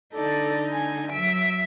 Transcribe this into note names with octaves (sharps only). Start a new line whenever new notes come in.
D3 D#4 A4 D5
G#5
F#3 E5 D7